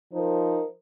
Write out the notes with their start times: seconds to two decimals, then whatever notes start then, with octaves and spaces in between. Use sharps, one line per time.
0.14 F3 D#4 A#4 C5